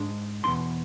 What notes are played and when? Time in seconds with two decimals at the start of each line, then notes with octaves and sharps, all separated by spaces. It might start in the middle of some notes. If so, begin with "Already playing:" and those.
Already playing: G#2 G#3 D4
0.44 E2 B2 A3 E4 C6